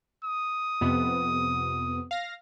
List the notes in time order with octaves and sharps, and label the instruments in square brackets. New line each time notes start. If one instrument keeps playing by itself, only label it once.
[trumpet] D#6
[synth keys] F2 C3 B3
F5 A#6